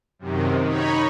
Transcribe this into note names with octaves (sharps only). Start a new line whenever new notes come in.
F#2 C3 D#3
D#4 C#5 B5